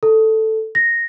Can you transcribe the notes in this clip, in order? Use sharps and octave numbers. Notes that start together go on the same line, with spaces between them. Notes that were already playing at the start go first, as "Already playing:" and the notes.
A4
A#6